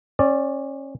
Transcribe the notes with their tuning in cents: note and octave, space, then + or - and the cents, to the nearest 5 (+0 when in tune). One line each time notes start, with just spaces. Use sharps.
C#4 -30 D5 +0